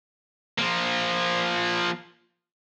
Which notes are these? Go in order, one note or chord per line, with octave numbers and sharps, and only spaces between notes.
F3 A#3